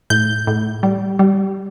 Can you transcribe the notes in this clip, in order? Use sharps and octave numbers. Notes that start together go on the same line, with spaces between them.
A2 G6
A2
G3
G3